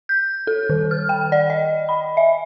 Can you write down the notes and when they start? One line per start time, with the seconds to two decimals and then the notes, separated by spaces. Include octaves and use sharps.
0.09 G6
0.47 A4
0.70 D#3
0.91 F6
1.09 G5
1.32 D5
1.50 D#5
1.89 B5
2.17 E5